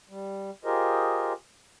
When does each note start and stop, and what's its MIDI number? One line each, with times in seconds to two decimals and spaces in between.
0.09 0.50 55
0.65 1.33 65
0.65 1.33 67
0.65 1.33 68
0.65 1.33 70
0.65 1.33 72
0.65 1.33 75